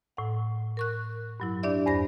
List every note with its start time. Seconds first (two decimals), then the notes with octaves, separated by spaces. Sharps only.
0.17 A2 F#5
0.77 A#4 C#6 F#6
1.40 G2 F#3 E4
1.63 D4 G4 D5 E5
1.86 E2 G2 C5 B5 A#6